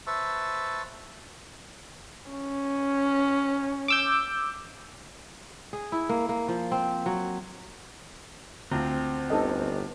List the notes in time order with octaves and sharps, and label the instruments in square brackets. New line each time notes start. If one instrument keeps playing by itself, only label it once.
[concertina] B4 C5 E5 A5 C#6 E6
[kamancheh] C#4
[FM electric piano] D6 E6 G6
[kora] G#4
E4
A#3
A#3
F3
C4
F#3
[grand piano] D2 [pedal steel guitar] C4 [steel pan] F4 A#5
[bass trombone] G1 [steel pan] D#4 A4 D#5